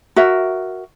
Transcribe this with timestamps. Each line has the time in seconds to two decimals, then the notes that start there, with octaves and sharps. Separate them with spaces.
0.16 F#4 A#4 E5